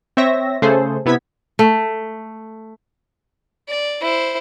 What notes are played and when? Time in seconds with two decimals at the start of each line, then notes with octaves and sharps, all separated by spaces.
0.17 C4 C#5 E5 A#6
0.62 C#3 A3 G#4 A4 C5
1.06 C3 B3 E4 G#6 B6
1.59 A3
3.68 D5
4.01 E4 C5